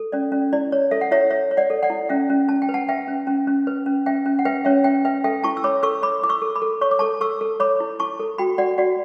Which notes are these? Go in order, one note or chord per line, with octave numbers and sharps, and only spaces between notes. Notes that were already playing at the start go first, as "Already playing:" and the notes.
Already playing: A4
C#4 D5
C#4
E4 D5
C#5
A4 E5
F#5
E4 C#5 E5
C#5 E5
C#5
D5 F#5
A4
D5 F#5
E4
C#4 E5 G5
C#4
C#4 A5
G5
B4
F#5 A5
B4 E5 G5
C#4
C#4
C#4
B4
C#4
C#4 E5 G5
C#4
F#5
B4 E5 G5
C#4 C#5 E5
C#4 E5 G5
B4 E5 G5
A4 E5 G5
E4 A5 C#6
E6
C#5 B5 D6
A4 C#6 E6
C#5 B5 D6
E4 D6
C#6 E6
A4
B5 D6
A4
C#5 C#6
D6
A4 A5 C#6
A4 C#6 E6
A4
C#5 B5 D6
E4
E4 A5 C#6
A4
F#4 G5 B5
F#4 D5 F#5
F#4 D5 F#5